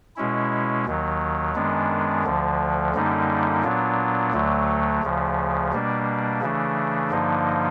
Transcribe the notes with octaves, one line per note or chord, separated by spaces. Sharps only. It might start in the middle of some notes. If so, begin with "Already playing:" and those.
B2 G#3 C#4 E4
D#2 D#3 F#3
F#2 D#3 G#3 B3 D4
D2 D3 F3
F#2 D3 G3 A#3 D#4
A#2 F#3 B3 D4
D2 D3 F#3 A3
D2 C#3 F3
B2 G3 A#3 D4
C#3 E3 A3 D4
G2 D3 F3 A#3 D#4